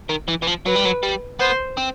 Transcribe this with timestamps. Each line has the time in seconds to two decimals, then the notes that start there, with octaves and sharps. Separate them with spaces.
0.09 D#3
0.28 E3
0.42 E3
0.47 F3
0.66 F#3 B4
0.75 G3
0.85 F#3
1.03 G3
1.40 B3 C5
1.78 C4